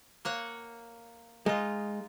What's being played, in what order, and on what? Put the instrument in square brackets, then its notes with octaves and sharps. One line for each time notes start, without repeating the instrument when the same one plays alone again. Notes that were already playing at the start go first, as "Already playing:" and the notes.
[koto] A#3 C#5 F#5
[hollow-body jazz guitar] G#3 [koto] D#4 F4